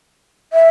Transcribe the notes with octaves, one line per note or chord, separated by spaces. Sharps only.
E5